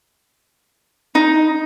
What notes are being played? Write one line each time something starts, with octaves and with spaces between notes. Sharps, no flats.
D#4